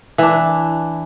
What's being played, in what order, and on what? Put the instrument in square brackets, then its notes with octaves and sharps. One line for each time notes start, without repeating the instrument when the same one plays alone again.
[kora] E3 D4